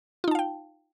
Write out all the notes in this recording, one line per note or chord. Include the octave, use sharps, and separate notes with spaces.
D#4 F4 F5 G5 A5